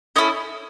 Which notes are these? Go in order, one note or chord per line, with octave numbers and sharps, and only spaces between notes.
C#4 E4 A4 D#5